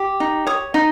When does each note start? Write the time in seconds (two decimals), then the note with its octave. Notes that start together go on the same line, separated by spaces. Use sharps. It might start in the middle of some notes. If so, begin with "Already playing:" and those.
Already playing: G4
0.20 D#4
0.47 C#5 D#6
0.74 D#4